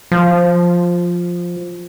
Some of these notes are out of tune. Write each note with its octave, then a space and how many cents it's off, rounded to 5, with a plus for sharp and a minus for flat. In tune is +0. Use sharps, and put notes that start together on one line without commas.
F3 +5